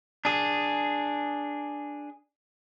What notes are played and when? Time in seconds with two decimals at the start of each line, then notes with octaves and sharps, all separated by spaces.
0.25 D4 G#4